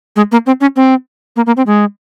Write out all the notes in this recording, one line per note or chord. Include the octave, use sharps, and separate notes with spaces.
G#3
A#3
C4
C#4
C4
A#3
A#3
C4
G#3